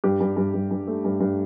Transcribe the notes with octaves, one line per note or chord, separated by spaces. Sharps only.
G2 G4
G2
G2
G2
G2
A3
G2
G2